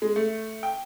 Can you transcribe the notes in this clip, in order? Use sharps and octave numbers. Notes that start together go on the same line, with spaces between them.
G#3
A3
G5